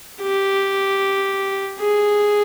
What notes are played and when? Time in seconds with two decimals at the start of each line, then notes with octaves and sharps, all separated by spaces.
0.21 G4
1.80 G#4